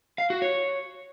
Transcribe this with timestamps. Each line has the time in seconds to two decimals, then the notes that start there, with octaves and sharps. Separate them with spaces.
0.18 F5
0.30 F#4
0.42 C#5